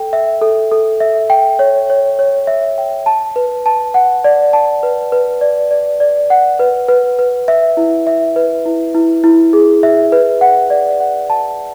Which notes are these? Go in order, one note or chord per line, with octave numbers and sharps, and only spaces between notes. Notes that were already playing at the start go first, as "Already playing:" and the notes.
Already playing: A4 G5
E5
A4
A4
E5
G5
C#5
C#5
C#5
E5
G5
A5
B4
A5
F#5
D5
A5
B4
B4
D5
D5
D5
F#5
B4
B4
B4
E5
E4
E5
B4
E4
E4
E4
G#4
E5
B4
F#5
D5
F#5
A5